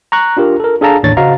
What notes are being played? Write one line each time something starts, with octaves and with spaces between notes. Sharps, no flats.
A#5 C#6 F#6
D4 F4 G4 A#4
A4 A#4
D4 G#4 A4 F5 A5 A#5
A1 D#2 A2 D4 C#5 A6
C#3 F#4 C5 D#5 F5 A#5